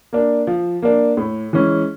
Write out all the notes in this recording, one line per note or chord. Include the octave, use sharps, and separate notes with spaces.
A#3 D4
F3
A#3 D4
A2
E3 G#3 C#4